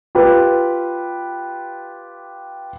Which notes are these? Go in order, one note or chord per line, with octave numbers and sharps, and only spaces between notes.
F4 G4 B4